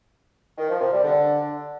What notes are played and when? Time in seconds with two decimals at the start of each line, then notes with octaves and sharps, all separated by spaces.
0.58 D#3
0.69 F3
0.81 C3
0.92 G3
1.03 D3